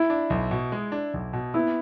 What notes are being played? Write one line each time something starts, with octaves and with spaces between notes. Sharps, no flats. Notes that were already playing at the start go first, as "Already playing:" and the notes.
Already playing: E4
D4
B1
B2
G#3
D4
B1
B2
B3 E4